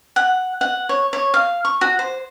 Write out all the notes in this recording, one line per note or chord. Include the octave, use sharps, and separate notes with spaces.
F#5
F#5
C#5
C#5
F5
C#6
F#4
C5